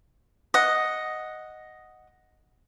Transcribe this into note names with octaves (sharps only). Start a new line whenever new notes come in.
D#5 F#5